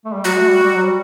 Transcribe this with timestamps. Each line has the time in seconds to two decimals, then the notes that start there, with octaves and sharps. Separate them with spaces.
0.05 A3
0.14 G3
0.24 F#3 F#4
0.37 A3
0.51 G3
0.63 G3
0.74 F#3
0.85 G3